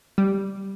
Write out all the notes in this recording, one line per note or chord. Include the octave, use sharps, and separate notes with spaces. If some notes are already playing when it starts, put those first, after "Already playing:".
G3